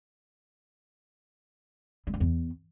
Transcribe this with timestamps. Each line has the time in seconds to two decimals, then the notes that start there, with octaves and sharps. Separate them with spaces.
2.07 G3
2.14 G2
2.20 E2